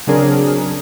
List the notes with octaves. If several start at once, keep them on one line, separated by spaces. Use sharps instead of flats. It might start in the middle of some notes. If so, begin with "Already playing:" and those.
C#3 F#3 C4 D4 G#4 A#4